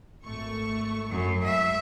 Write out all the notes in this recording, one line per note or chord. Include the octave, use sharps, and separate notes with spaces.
G#1 A3 C#6
F#2
G#2 E5